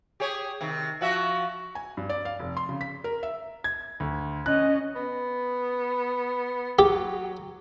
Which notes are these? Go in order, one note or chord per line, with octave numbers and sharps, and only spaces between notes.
G4 G#4 C#5
C3 D#3
F3 F#4 E5
G#5
G2
D5
F5
F1
C6
C#3
B6
A#4
E5
G#6
D2
C#4 D#5 F#6
B3
F#3 G4